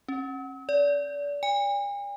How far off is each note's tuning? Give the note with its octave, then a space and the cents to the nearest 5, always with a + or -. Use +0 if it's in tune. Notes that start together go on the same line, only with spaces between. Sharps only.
C#4 -40
D5 -30
G#5 -45